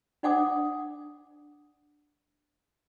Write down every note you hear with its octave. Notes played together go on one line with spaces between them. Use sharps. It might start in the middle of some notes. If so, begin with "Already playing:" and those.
D4 D5 F#5 G#5 D6 D#6